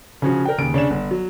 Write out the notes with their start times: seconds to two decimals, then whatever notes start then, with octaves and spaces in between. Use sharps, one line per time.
0.22 C#3 F3 C#4 F#4
0.45 A#4 G5
0.58 D#2 C#3 D7
0.74 C#3 D4 C#5 E7
0.90 G1
1.11 F#3